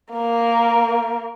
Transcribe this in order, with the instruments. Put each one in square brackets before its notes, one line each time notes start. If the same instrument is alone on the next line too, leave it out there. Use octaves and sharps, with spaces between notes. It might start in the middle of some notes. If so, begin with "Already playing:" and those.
[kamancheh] A#3 A#4